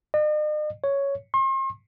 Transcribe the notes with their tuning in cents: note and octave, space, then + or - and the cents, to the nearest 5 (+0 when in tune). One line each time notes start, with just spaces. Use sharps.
D#5 -45
C#5 +5
C6 +40